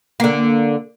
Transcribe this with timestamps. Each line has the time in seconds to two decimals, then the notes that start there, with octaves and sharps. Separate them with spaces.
0.20 D3 A#3